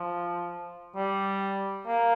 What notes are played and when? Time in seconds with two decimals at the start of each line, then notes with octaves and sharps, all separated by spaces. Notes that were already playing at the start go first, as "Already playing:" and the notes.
Already playing: F3
0.96 G3
1.87 A#3